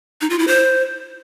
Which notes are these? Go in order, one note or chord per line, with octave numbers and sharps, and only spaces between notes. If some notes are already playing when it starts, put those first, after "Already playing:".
D#4
F4
E4
C5